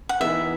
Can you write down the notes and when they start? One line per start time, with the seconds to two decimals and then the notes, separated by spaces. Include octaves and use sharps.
0.09 F#5
0.20 E3 B3 D#4 E5